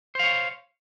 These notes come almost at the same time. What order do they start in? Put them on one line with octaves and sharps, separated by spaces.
C5 F5 C#5